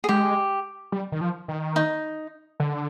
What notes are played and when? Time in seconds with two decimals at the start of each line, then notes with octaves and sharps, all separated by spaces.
0.04 G#4
0.09 G#3 G4
0.92 G3
1.12 D#3
1.21 F3
1.48 D#3
1.76 D#4
2.60 D3